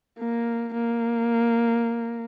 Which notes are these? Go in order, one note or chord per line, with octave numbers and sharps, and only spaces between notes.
A#3
A#3